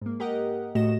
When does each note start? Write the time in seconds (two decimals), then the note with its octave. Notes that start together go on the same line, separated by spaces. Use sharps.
0.01 G#2 A#3
0.20 G4 A#4 D#5 F#5
0.75 A2 A3 F#4 D#5 A#6 E7